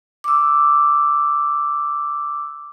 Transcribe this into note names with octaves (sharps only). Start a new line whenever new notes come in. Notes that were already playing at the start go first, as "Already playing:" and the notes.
D6 E6